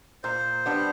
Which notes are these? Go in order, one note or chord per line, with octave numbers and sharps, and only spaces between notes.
A#2 C5
G3 B3 D4